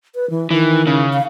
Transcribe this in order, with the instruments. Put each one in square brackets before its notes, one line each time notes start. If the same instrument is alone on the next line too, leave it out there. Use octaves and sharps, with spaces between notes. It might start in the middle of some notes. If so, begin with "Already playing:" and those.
[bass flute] B4
E3
[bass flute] D#3 [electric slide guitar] E3
[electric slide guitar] C#3
[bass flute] F5